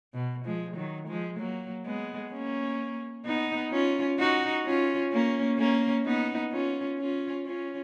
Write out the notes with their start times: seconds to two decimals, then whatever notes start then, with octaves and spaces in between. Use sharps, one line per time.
0.14 B2
0.45 F3 G#3
0.76 D#3 F#3
1.08 F3 G#3
1.39 F#3 A#3
1.86 G#3 B3
2.32 A#3 C#4
3.25 B3 D#4
3.72 C#4 F4
4.19 D#4 F#4
4.66 C#4 F4
5.12 A#3 C#4
5.59 A#3 C#4
6.05 B3 D#4
6.52 C#4 F4
6.99 C#4 F4
7.46 C#4 F4